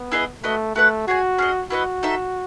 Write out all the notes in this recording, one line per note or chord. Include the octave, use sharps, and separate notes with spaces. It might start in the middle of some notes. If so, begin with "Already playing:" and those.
Already playing: B3
E4 G#4 B4 D#5
A3 F#4 B4 D#5
A3 F#4 B4 F#5
F#4 G#4 C#5 G#5
C#4 G#4 D#5
E4 F#4 B4 D#5 F#5
D#4 A4 E5